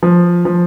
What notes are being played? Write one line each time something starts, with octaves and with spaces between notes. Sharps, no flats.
F3
F3